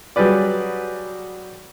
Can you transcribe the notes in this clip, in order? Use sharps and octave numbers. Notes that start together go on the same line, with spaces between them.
F#3 G3 G#4 B4 D5